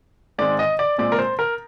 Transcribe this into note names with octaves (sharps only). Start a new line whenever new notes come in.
G#2 D#3 G#3 C4 D5
D#5
D5
A#2 G#3 C4 D5
A#4
C5
A#4